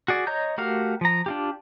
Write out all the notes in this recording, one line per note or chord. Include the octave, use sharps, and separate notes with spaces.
F#4 G#4 D5
C#5 D#5 A#5 G6
A3 F#4 G4 A#4 F5
F3 A#5
D4 F4 G4